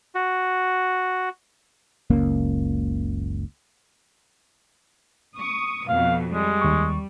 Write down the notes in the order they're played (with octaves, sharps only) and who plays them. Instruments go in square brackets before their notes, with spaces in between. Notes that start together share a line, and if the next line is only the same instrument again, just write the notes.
[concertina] F#4
[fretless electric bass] F#1 C#2 A#3 C#4
[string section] C#6 D#6
[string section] F2 B2 [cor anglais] F5
[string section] G3 [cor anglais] G#3
[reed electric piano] D#2 C#6